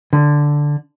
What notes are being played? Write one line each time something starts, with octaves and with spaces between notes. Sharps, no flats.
D3